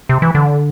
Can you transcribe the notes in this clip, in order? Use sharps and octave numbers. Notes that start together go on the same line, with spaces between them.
C3
E3
D3